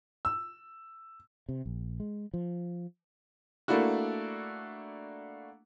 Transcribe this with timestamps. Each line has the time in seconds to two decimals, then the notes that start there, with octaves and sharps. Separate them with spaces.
0.25 E6
1.49 C3
1.66 A#1
2.00 G#3
2.34 F3
3.68 A3 A#3 D4 E4 F#4